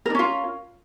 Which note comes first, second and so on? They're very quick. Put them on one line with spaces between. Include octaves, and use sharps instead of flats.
A#4 D4 C#4 F4